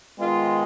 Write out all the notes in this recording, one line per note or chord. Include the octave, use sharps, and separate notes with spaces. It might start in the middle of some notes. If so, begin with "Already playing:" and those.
D#3 G#3 B3 F4